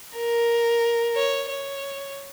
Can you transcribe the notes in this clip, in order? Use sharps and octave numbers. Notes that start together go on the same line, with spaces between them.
A#4
C#5
C#5